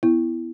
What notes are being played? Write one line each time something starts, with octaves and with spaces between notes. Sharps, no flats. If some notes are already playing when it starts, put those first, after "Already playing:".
B3 E4